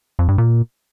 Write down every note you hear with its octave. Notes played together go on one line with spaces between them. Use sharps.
F2
G2
A#2